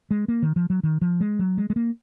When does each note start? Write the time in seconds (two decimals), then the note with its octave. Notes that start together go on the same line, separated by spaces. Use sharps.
0.11 G#3
0.28 A#3
0.42 D#3
0.56 F3
0.70 F#3
0.83 D#3
1.01 F3
1.20 G#3
1.39 F#3
1.57 G#3
1.70 G#3
1.76 A#3